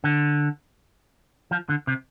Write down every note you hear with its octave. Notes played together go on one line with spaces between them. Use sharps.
D3
F3
D3
C3